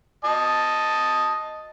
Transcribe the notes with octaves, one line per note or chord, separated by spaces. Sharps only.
D#5 A5